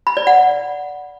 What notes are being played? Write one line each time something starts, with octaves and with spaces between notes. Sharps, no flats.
B5
D5
F#5